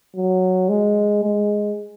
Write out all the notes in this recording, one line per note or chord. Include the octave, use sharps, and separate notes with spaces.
F#3
G#3
G#3